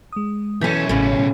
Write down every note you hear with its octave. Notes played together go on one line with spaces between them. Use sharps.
G#3 D#6
B1 E3 C#4 A4 G6 B6
A1 A2 C#3